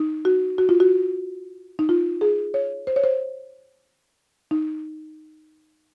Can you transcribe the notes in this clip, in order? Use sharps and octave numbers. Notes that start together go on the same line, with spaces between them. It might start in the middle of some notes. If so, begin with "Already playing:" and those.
Already playing: D#4
F#4
F#4
F4
F#4
D#4
F4
G#4
C#5
C5
C#5
C5
D#4